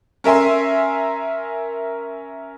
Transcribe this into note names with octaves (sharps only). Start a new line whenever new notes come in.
C#4 A#4 E5 G#5 C6